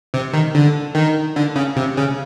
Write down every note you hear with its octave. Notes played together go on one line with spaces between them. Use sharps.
C3
D#3
D3
D#3
D3
C#3
C3
C#3